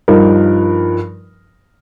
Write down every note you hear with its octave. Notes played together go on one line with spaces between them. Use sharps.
G2 F3 D#4 A#4